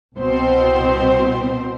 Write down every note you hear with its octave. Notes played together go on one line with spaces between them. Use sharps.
C2 B2 C4 C5